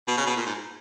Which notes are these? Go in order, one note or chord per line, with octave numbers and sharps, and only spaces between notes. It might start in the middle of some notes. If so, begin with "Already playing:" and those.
B2
C#3
B2
A#2
G#2